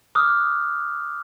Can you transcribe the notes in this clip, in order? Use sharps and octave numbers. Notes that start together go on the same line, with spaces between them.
D6 D#6 F6 F#6